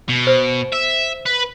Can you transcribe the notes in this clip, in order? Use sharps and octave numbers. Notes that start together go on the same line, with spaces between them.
B2
C5
E5
B4